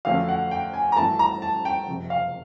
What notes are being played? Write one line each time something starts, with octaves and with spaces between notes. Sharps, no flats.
F2 D3 F#3 A3 C#4 F5
F#5
G5
G#5
A#5
G#1 G2 E3 A3 A5
A#5
A5
G5
F#1 F2 C3
F5